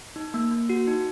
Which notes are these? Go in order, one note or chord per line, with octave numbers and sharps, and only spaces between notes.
D#4
A#3
A#3
F#4
D#4